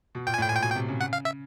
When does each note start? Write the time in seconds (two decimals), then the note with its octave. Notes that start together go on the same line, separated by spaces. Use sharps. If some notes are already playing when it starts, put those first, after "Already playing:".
0.15 B2
0.27 A#2 G5
0.34 G#5
0.38 A2 G5
0.48 G#5
0.51 A#2
0.55 G5
0.63 B2 G#5
0.70 G5
0.76 C3
0.89 C#3
1.01 F#5
1.13 F5
1.25 E5